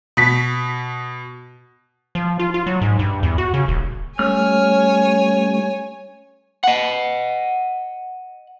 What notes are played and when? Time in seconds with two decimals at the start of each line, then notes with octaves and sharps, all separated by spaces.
0.17 B2 B6
2.15 F3
2.39 F4
2.54 F4
2.67 F#3
2.81 G#2
2.99 G2
3.23 E2
3.38 F#4
3.54 C#3
3.68 D#1
4.19 G3 A3 C#4 C#5 G#5 F6
6.64 D#5 F#5